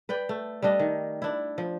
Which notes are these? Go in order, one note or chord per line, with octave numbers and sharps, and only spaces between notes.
B4 D5 G5
A3
G3 A3 D4 D#5
D#3
D4 E4
F3